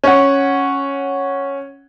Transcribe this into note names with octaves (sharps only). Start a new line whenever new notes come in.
C#4 F#5